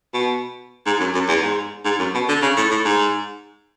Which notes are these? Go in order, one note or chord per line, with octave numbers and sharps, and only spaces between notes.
B2
G#2
F#2
F#2
E2
G#2
G#2
F#2
B2
D3
C#3
A2
A2
G#2